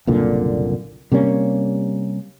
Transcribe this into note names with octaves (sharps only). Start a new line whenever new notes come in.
F#1 C2 A#2 D3
C3 G3 A#3 C#4